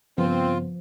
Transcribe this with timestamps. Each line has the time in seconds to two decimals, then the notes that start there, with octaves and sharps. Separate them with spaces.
0.18 G2 C#3 F3 B3 C4 F4